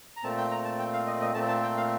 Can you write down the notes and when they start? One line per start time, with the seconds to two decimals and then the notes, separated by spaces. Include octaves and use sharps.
0.17 A#5
0.23 A#2 A3 C4 A5
0.38 G5
0.51 A#5
0.65 A5
0.79 G5
0.93 F5
1.07 D#5
1.22 D#5
1.35 A#2 A3 C4 A5
1.48 A5
1.63 G5
1.77 F5